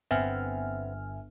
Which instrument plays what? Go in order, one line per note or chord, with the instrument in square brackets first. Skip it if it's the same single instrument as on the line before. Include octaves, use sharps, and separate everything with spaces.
[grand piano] G1 [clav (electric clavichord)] B3 C4 [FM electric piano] E5 G#5 F6